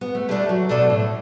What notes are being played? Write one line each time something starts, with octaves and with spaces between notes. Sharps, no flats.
B3
A3
G3 A3 D4 A4
F#3
B2 A3 D4 A4
A2